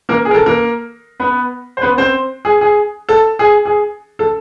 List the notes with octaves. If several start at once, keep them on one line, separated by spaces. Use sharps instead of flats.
A#3 A#4
G#4
A#4
A4
A#3 A#4
B3 B4
C5
B3 B4
C4 C5
G#4
G#4
A4
G#4
G#4
A4